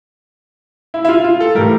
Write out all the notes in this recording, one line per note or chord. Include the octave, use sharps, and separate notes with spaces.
E4
E4
F4
F4
A4
A2 E3 G3 A#4